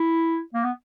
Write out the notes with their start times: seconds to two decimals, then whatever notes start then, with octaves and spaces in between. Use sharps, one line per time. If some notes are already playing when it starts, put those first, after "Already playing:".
Already playing: E4
0.54 A#3
0.64 B3